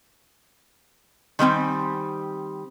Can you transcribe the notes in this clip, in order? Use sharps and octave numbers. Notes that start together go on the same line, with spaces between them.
D#3 G3 C4 G#5